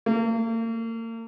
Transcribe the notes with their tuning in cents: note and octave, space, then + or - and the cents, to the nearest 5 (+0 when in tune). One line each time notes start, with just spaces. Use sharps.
A#3 -40